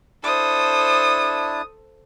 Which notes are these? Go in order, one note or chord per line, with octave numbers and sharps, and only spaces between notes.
D4 E4 A4 C5 A5 D#6